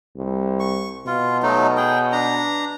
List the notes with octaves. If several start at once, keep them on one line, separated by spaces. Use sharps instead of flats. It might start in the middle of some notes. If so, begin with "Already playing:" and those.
C2
C#6
B2 F4
F#3 A3 D#4
G#4 G5
D4 A#5